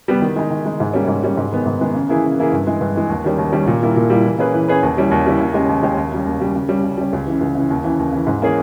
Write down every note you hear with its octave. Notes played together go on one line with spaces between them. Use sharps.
G3 B3 G4
D#3
G#3 D#4
D#3
G#3 D#4
G#2
G3 A#3 C#4
G#2
G3 A#3 C#4
G#2
D#3 G#3 B3
G#2
D#3 G#3 B3
C#3
E3 A#3 E4 G#4
C#3
E3 A#3 E4 G#4
G2
E3 G#3
G2
E3 G#3
D#2
D#3 G3 C#4
D#2
D#3 G3 C#4
A#2
G3 A#3 E4
A#2
G3 A#3 E4
E3
A#3 C#4 G#4 B4
E3
A#3 C#4 G#4 B4
D#2
C#3 G3 C#4 E4
D#2
C#3 G3 C#4 E4
D#2
C#3 G#3 C#4 G4
D#2
C#3 G#3 C#4 G4
D#2
C#3 G3
D#2
C#3 G3
C#3
G3 C#4
C#3
G3 C#4
C#2
C#3 E3
C#2
C#3 E3
D#2
C#3 E3
D#2
C#3 E3
G#2
E3 A#3 C#4 G#4